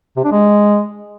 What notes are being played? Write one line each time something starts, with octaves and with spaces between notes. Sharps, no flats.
C3
D4
G#3